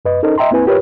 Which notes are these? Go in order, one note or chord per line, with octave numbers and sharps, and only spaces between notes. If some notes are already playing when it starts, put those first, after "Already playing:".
F#2 B4 D#5
C#4 D#4 A4 A#4 C5 D#5
D#5 E5 G5 A#5 C6
A#3 C4 E4 B4 G#5
F4 G4 A#4 B4 C#5